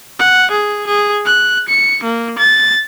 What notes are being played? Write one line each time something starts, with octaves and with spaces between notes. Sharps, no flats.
F#5
G#4
G#4
F#6
C#7
A#3
A6